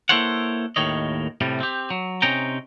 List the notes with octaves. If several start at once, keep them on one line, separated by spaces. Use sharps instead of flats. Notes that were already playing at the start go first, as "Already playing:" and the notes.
A#3 E4 A4 C5 C#5 F#5
D#2 A2 D#3 C#5 D#5
A2 C3 G3
C4 G4
F#3
C3 C4 C#4 D#4 G5 A#5